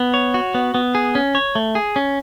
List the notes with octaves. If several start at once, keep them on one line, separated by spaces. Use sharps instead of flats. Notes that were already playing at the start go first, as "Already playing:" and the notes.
Already playing: B3
C#5
F#4
B3
B3
G#4
C#4
C#5
A3
G#4
C#4